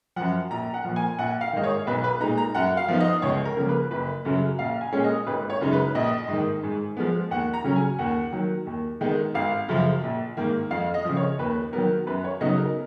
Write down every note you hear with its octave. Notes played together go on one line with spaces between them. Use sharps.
F#2 F3 F#5
A#1 A#5
F#5
A#2 F3
G#5
A#1 F#5
F5
G#2 D#3 D#5
C#5
B1 B4
B4
A#2 G#3 D#4 A#5
A#5
F#2 F#5
F5
F3 B3 D#4
D#5
C#2 C#5
A#4
C#3 F3 A#3
B4
F#1 B4
F#2 C#3 F#3
A#1 F5
G#5
A#2 G#3 C#4
D#5
G#1 B4
C#5
F#2 C#3 G#3 D#4
B4
A#1 D#5
G#2 D#3
G#2
F3 G#3 B3
D#2 F#5
A#5
C#3 F#3 C#4
G#5
D#2 F#5
D#3 F#3
D#2
D#3 G#3 B3 D#4
G#1 F5
F#2 C#3 F3
A#1
G#2 D#3 A#3
F2 F5
D#5
C#3 F3
C#5
D#2 B4
D#3 F#3 B3 A#4
F#2 B4
C#5
C#3 F#3 B3 D#4 D#5
A#4